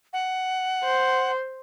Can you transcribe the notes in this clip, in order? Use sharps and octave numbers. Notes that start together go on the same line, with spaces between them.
F#5
C5